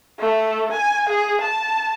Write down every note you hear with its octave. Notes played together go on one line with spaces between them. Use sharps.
A3
G#5
G#4
A5